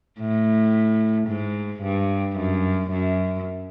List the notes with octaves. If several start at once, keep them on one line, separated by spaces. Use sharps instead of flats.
A2
G#2
G2
F#2
F#2